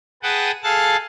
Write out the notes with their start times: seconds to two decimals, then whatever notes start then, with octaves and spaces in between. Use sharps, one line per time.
0.23 G#4 B4 F#5 G5 A5 D#6
0.63 G#4 A4 F5 A5 F#6 A6